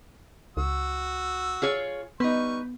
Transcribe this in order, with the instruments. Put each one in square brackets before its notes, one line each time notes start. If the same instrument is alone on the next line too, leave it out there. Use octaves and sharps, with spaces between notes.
[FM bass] C#2 [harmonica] F#4 E6
[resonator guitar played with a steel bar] F4 G#4 C#5
[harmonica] G3 C#6 [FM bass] B3 [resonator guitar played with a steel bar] D#4 B4